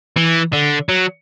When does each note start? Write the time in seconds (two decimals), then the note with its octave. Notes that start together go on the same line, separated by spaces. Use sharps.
0.17 E3
0.53 D3
0.89 F#3